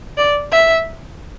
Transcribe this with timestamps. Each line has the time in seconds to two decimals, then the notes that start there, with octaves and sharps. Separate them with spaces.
0.17 D5
0.52 E5